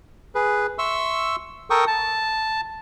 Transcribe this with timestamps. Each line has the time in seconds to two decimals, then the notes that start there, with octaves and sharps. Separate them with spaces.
0.35 G#4 B4
0.78 E5 C6 C#6 E6
1.70 A4 A#4 G5 C#6 D#6
1.87 A5